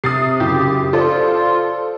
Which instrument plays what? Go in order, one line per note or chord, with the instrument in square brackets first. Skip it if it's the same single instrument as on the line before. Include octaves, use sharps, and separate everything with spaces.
[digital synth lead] C3 [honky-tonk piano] D#6 A6 C7
[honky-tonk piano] F#2 C#3 E4 [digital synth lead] G4
[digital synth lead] F4 [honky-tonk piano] A4 C5 D5